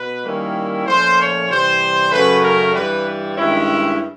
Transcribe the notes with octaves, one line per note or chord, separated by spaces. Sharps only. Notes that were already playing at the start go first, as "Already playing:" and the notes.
Already playing: B2 B4
D#3 G3 A#3 C#4 E4
A#2 F3 A3 C#4 C5
C#5
C3 E3 G3 C5
F#2 C#3 F#3 A3 C#4 B4
A#4
G2 E3 G3 B4
G2 D#3 G#3 C#4 E4